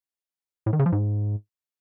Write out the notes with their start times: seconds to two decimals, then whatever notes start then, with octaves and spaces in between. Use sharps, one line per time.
0.66 A2
0.73 D#3
0.79 C#3
0.86 F3
0.92 G#2